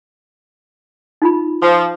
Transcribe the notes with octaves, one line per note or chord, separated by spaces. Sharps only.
D#4 F4 B5
F3